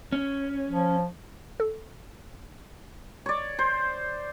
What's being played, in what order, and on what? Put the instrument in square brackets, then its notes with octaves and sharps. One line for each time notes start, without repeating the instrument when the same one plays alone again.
[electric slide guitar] C#4
[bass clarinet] F3
[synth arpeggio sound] A4
[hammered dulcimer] C#5 D5
C5